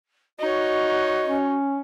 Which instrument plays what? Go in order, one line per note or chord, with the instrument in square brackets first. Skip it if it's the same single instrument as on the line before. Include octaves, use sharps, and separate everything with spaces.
[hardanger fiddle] D#4 C#5 [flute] F#4 [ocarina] D#5
[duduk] C#4